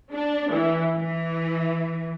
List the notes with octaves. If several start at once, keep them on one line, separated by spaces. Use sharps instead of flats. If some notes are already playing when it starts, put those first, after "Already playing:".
D4
E3
E3